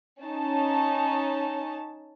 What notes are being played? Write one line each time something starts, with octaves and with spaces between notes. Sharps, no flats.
C#4 D#4 A5